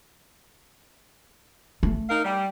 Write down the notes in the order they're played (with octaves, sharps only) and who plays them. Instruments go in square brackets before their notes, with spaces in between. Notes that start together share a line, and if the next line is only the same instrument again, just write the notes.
[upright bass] A3
[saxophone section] D#4 A#4 F5
G3